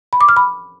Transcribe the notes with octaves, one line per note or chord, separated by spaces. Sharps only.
B5
D6
F6
B5